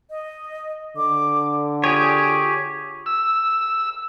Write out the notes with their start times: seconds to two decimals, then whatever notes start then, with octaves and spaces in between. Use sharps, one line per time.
0.10 D#5
0.97 D3 D6
1.84 F4 G4 G#4 C#5
3.06 E6